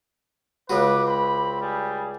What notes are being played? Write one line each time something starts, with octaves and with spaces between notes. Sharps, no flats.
C#2 C#3 F#4 B4 D6
C4 B5
G3 G#4